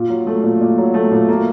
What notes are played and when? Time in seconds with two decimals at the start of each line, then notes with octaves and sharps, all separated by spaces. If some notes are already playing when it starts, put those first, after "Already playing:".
Already playing: A#2
0.10 F#3
0.27 A3
0.44 A#2
0.61 A#2
0.78 F#3
0.94 A3
1.11 A#2
1.29 A#3